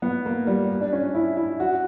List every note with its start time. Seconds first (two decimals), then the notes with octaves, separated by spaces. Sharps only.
0.02 B3
0.26 A#3
0.47 G3
0.81 D4
0.93 C#4
1.14 E4
1.37 E4
1.60 F#4